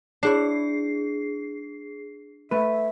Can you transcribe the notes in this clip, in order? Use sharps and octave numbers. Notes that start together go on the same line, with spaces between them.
D4 E4 G#4 C7
A3 B4 E5